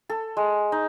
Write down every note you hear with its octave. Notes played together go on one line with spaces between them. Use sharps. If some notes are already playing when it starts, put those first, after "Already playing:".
A4
G#3
D#4